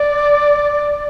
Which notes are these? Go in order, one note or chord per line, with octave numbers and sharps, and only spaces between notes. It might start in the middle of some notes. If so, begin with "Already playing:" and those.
Already playing: D5